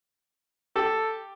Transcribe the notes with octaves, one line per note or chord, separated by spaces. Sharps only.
G4 A4